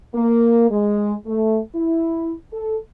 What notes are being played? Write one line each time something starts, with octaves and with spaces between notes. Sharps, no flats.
A#3
G#3
A3
E4
A4